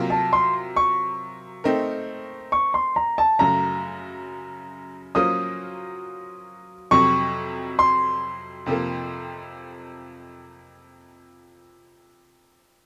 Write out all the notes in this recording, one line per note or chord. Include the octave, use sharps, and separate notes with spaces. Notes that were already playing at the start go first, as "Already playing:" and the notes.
Already playing: C3 F#3 A#3 F4 A#4
A5
C6
C#6
A3 C4 D#4 A#4
C#6
C6
A#5
A5
F#2 C#3 F#3 A3 A#5
F#3 A#3 C#4 F4 C5 D#6
F2 C3 F#3 C#6
C6
F2 C3 F3 A#3